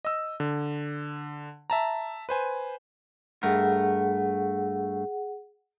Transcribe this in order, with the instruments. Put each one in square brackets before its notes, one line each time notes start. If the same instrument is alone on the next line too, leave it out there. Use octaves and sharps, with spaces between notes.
[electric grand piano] D#5 E6
D3
E5 A5 A#5
B4 C5 G#5
[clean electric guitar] G2 A3 A#4 [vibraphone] G#4 F#5